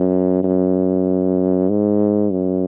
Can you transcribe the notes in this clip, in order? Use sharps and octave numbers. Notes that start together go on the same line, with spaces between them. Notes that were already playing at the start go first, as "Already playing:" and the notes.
Already playing: F#2
F#2
G#2
F#2